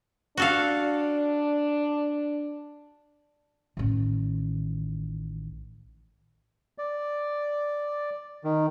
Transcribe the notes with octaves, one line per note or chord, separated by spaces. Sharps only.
D4 F#4 A4 F5
A1 D#3
D5
D#3